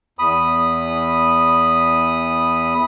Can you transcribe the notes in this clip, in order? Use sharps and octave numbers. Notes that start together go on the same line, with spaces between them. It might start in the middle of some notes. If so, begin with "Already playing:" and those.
E2 B5 D#6